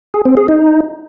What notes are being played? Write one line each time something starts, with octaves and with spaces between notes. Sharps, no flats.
G#4
C4
G#4
D#4